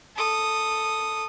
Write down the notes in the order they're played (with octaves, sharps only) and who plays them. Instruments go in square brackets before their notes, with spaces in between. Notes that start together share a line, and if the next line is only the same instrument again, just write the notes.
[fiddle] A4 D#6